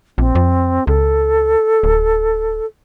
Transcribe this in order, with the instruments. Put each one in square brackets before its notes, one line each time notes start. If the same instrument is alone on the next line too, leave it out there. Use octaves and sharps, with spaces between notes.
[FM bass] A#1 [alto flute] C4
[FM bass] F2
[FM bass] C#2 [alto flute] A4
[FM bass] D1